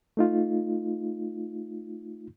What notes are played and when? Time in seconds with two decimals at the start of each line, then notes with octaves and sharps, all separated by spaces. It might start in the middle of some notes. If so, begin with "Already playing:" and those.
0.17 A3 D#4 F4